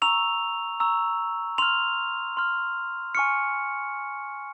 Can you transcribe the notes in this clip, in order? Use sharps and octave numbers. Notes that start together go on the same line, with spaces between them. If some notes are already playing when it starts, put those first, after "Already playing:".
A#5 C#6 E6 F7
A#5 C#6 E6
C6 F6 F7
C6 F6
G#5 C#6 F6 C#7